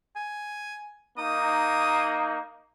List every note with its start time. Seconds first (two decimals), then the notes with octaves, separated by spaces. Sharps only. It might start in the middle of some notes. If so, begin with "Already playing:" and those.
0.16 G#5
1.18 A#3 D#4 D#6